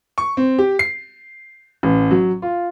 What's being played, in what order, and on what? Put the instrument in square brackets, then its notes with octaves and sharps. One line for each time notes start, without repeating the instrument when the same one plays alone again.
[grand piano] C#6
C4
G4
C7
A1
F#3
F4